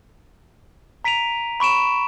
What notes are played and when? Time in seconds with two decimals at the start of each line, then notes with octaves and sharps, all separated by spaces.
1.04 A#5 B6 D7 D#7 F7
1.60 B5 C#6 D7 E7